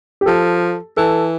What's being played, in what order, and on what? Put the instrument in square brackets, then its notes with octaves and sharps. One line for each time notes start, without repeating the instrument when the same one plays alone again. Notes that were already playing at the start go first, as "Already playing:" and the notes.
[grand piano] G4
[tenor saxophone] F3 [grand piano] A4
[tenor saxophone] E3 [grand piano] A4